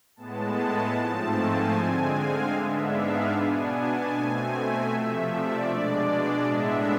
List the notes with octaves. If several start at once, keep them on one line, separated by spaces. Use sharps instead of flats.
A2 G#3 B3 A5
G#2 F3 A3 C4 A5
G#5
D3 G#3 C4
F5
G#2 G#3 B3 D4 E5
F5
B2 B3 D4 G#5
A5
B2 A3 C4 G#5
E5
C3 F3 A3
D5
B2 G#3 D4
A2 G#3 B3 D4 E5